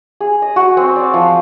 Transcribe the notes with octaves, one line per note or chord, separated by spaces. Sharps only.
G#4
D#5
F#4
C4
D5
F3